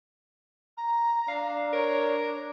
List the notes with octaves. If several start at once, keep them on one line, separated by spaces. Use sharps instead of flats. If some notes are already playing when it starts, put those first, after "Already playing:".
A#5
D4 F5
A#4 C#5